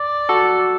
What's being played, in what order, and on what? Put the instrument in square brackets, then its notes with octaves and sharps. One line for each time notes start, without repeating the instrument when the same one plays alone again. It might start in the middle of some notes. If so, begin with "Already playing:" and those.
Already playing: [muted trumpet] D5
[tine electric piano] F#4 A4